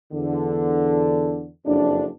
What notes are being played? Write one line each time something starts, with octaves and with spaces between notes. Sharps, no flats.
E2 D3
F#1 F2 D4